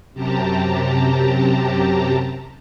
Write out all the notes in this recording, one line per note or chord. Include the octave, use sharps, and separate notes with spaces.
F#2 C3 G4 A5 A#5